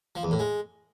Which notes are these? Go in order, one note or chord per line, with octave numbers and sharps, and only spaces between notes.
F3
E2
A2
G#3